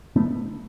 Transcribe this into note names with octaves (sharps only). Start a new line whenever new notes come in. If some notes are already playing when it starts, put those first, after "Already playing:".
A3 B3